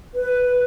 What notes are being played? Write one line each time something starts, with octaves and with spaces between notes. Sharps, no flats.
B4